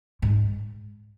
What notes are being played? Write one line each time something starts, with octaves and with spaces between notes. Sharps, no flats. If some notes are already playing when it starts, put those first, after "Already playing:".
G#2